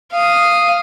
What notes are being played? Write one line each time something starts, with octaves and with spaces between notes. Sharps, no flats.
F5 D#6